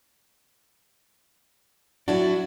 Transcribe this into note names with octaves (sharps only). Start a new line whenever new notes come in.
F#3 D4 E4 F#4